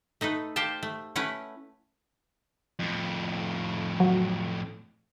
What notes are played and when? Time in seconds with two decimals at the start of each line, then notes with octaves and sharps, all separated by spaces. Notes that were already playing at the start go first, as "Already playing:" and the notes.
0.21 A3 D#4 A4 B4
0.56 G4 C5 F5 G5 A5
0.83 A3
1.16 A3 C#4 E4 B4 C#5 F#5
2.79 F2 A2
4.00 F#3